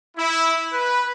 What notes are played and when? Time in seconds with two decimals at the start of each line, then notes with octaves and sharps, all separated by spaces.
0.18 E4
0.73 B4